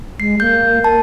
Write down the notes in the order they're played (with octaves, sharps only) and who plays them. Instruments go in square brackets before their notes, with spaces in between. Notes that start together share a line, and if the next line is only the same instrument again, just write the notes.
[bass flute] G#3 [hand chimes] C7
[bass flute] A#3 [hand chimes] G6
[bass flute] A#4 [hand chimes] A5